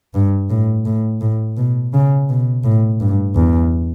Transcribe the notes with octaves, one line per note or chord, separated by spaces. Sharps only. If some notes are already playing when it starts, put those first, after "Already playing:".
G2
A2
A2
A2
B2
C#3
B2
A2
G2
E2